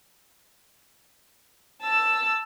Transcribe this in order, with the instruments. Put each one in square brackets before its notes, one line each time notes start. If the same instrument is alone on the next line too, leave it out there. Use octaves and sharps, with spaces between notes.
[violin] A5 E6